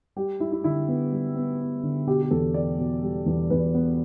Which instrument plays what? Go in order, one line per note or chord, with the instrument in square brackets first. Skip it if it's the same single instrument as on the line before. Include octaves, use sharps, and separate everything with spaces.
[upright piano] G3 G4
G3 E4
E4
D3 E4
B3
G3
B3
B3
D3
B2 G4
G4
E2 A4
B3 D5
B2
G3
E2
E2 B4
B3